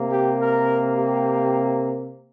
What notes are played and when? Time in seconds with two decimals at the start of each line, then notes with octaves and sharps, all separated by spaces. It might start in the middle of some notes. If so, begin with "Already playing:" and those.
Already playing: C3 A#3
0.09 G4
0.38 A#4
0.96 G4